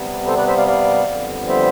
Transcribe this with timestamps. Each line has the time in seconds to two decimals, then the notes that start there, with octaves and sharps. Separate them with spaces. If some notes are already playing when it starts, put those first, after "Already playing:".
Already playing: C3 G3 B3
0.27 A4 C5
0.37 B4 D5
0.47 C5 E5
0.57 D5 F5
0.67 D5 F5
1.08 F2 D3 G3 B3
1.49 C5 E5